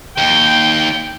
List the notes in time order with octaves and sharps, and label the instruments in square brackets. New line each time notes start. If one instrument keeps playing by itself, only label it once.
[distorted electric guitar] D#2 [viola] G5